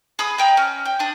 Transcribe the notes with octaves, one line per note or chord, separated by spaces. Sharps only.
G#4 B5 D#6
D#5 G5 A#5
C#4
G5
D4 D#6